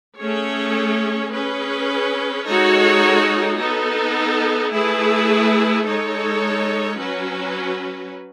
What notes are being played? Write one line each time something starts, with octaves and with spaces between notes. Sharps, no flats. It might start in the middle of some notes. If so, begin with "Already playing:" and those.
A3 C#4 G#4 C#5
C#4 G#4 B4
G#3 D#4 F#4 A4 C#5
B3 D#4 A4
A3 E4 G#4 B4
G#3 D#4 A4 C#5
F#3 C#4 F#4 B4